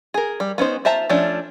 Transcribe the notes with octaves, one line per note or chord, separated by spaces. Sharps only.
G#4 A#4
G3
B3 C#4 D#4 C5
F4 C5 E5 A5 A#5
F3 A3 C#4 D4